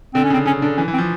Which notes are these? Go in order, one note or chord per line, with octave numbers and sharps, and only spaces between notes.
D3 C4
C#4
C#3 C4
C#3 C#4
D3 D4
E3 C#4
E3
C4
F3